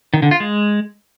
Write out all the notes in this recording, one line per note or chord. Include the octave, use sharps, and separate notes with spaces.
D#3
D3
F4
G#3